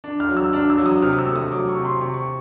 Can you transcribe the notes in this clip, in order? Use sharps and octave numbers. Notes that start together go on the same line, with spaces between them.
D4
F6
F#3
E6
D4 F6
E6
F#3
D#6
C3 F6
D#6
E6
A3
D#6
F#3 D6
C#6
C3
C6
C3 C#6
C#6